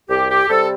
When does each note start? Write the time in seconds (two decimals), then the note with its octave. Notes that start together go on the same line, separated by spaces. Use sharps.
0.09 C2 G4
0.30 G4
0.49 C3 G3 C4 A4